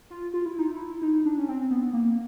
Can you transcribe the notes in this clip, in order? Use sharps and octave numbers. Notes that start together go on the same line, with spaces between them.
F4
F4
E4
D#4
E4
D#4
D4
C#4
C4
B3
A#3